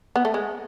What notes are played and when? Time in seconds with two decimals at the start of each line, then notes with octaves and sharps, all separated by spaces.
0.16 B3
0.25 A3
0.34 G#3